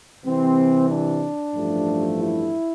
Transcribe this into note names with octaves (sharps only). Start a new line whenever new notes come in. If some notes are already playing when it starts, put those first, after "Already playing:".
C2 C3 E3 C4
D4
A1 G2 F3 A3
E4